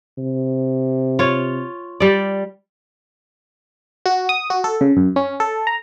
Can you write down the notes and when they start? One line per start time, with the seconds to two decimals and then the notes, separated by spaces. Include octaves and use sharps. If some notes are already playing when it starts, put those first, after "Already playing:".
0.18 C3
1.19 F4 C#5
2.00 G3 D5
4.06 F#4
4.29 D#6
4.50 F#4
4.64 A4
4.81 C#3
4.97 F#2
5.16 C#4
5.40 A4
5.67 A#5